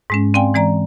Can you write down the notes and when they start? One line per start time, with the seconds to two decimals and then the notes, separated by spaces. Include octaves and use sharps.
0.10 G#2 G#3 C#4
0.34 C4 D5 F5 G5 G#5 C6
0.54 E3 G#3 D5 A#5